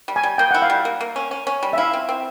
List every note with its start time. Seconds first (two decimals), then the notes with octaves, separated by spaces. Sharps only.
0.08 G3
0.16 G#5
0.23 G3
0.38 A#3 G5
0.51 E4 F#5
0.62 F5
0.70 G3
0.85 A#3
1.01 A#3
1.16 C#4
1.31 C#4
1.47 C#4
1.63 G3
1.73 E5
1.77 E4 F5
1.93 C4
2.09 C4